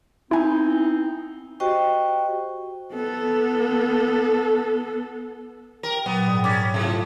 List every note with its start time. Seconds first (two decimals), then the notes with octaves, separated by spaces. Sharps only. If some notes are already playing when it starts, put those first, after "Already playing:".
0.31 B3 C4 D#4 E4 G#5
1.60 F#4 G4 C5 D#5 G5 C#6
2.93 B3 A4
5.83 G4 A#4
6.06 A#2 F#3 B3
6.27 G#2 G3 D#4
6.44 C#4 G#4 F5 D6 A6
6.74 A2 C3 F3 A3